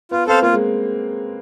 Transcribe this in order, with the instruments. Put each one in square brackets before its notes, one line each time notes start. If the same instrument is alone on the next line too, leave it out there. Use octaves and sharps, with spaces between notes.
[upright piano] B3 [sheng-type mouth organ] F4
[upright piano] C4 [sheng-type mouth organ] A4 C5 F5
[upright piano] A#3 [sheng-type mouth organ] F4
[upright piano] G#3